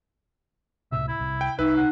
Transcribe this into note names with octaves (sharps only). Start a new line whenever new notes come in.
C#2 A2 C3 E5
E4
C2
G5
C2 D#4 B4 E5
F#5